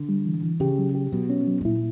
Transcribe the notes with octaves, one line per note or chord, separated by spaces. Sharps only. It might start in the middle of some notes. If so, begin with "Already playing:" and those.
Already playing: D3
G3
E3
E3
C#3 G4
F#3
G4
B2 F#3
C#4
F#3
G2
A#2 E4